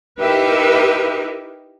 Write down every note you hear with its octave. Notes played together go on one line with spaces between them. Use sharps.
D#4 E4 G4 A#4 B4 E5